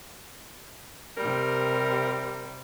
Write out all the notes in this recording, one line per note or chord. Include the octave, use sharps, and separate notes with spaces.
C3 G3 A#4